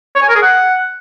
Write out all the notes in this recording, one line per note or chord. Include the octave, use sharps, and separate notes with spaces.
C#5
G#5
A#4
G#4
F#5